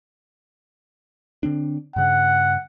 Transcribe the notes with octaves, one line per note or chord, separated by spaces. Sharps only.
D3 C4 D4
G2 C#3 F#5